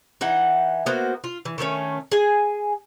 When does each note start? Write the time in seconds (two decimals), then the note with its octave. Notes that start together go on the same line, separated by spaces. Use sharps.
0.21 E3 D#4 F#5
0.86 A#3 B3 F#4 C5
1.24 F4
1.45 E3
1.58 D#3 A3 A#3 C#4
2.12 G#4 G#5